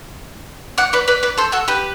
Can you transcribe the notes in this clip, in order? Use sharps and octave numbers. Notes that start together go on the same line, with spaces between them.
D5 F#5
B4 D5
B4 D5
B4 D5
A4 C5
F#4 A4
G4 B4